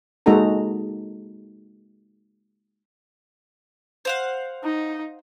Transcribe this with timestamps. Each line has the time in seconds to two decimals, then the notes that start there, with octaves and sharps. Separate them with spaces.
0.26 G#3 A#3 D#4 F#4 A4 A#5
4.05 C5 F5 F#5
4.64 D#4